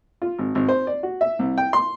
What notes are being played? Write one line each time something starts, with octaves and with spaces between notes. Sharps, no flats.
F4
G#1
G#1
C5
D5
F#4
E5
C2
G5
C6